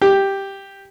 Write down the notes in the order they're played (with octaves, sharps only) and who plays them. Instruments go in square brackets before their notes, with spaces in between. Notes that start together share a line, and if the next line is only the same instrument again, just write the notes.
[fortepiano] G4